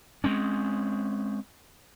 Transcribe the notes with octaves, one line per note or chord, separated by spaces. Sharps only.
G#3 C4 C#4